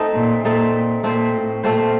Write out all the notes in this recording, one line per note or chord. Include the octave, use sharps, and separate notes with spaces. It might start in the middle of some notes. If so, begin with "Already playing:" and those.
Already playing: A3 C4 D#4 A4
A#2
A#2 A3 C4 D#4 A4
A#2 A3 C4 F4 C5
A2
A#2 A3 C4 F4 C5